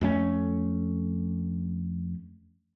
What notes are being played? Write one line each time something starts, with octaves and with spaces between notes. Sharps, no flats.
F2 A3 C#4